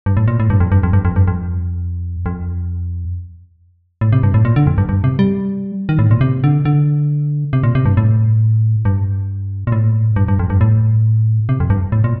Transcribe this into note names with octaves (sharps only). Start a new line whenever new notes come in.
G2
A2
A#2
A2
G2
F2
G2
F2
G2
F2
G2
F2
F2
A2
C3
G2
A2
A#2
D3
F2
G2
G2
C3
G3
D#3
A2
A#2
C3
D3
D3
C3
A#2
C3
G2
A2
G2
A#2
A2
G2
G2
F2
G2
A2
C3
F2
G2
A2
A#2